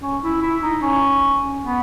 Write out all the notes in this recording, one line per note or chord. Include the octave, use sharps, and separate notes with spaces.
C#4
E4
E4
D#4
C#4
B3